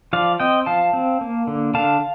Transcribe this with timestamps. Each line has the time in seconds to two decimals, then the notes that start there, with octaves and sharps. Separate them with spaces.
0.13 F3 D5 F5
0.40 C4 D#5 G5
0.66 F3 F5 A5
0.93 C4
1.21 A#3
1.47 D3
1.74 D3 F5 A5